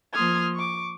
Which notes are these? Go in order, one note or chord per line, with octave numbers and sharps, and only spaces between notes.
F3 A#3 C6 D#6 F6 G#6
C#6 D6